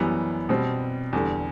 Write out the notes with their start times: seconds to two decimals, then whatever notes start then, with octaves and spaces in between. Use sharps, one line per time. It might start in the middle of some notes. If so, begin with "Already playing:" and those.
Already playing: F#2 E3 G3 B3
0.49 B2 G3 C4
1.13 E2 D3 G3